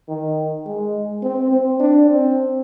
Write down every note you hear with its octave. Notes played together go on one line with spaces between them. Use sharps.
D#3
G#3
C4
C4
D4
C4